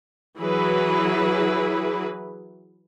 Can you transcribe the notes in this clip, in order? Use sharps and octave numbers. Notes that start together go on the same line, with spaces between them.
E3 F#3 E4 G#4 B4